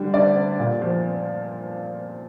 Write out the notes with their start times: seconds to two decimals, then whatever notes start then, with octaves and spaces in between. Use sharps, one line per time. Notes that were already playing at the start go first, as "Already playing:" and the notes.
Already playing: D3 G3
0.14 D2 D5
0.36 D2
0.59 A#2
0.81 F3